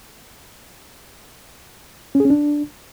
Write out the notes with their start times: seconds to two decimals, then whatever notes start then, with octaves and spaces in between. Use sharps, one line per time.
2.15 C#4
2.20 G#4
2.25 C#4
2.30 D4